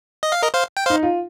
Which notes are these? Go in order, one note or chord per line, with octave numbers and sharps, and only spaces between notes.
D#5
F5
A#4 D#5
C5 F5
G5
D#4 C5 F5
F4